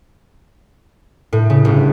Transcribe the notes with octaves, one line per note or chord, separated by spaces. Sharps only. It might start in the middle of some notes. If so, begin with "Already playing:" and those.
A2
C#3
G1